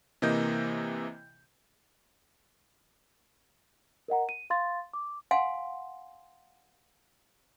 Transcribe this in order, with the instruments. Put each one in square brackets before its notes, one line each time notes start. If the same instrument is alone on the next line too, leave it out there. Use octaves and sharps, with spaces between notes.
[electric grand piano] C3 E3 A#3 D#5 G6
[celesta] A#4 D#5 F#5 A#5
D#7
F5 C6 A6
D6
[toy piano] F5 F#5 G#5 C6